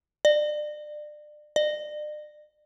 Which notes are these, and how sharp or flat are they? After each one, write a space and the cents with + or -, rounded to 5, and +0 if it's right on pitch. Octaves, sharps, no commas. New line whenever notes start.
D5 +30
D5 +40